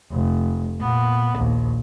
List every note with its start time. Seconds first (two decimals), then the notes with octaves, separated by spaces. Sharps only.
0.12 F1
0.80 A#2 B3
1.37 A#1 D#2